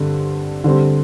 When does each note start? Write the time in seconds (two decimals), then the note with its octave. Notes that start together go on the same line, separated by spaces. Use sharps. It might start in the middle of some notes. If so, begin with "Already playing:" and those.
Already playing: G2 D3 C4
0.64 D3 G3 C4